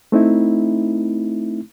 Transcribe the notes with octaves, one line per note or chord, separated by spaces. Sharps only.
A3 C4 D#4 E4